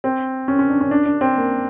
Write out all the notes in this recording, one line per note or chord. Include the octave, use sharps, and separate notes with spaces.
C4
C#4
C#4
D4
C#4
D4
D4
C4
A#3